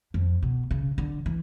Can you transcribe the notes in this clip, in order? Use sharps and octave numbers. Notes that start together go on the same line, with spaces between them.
F2
B2
C#3
D3
E3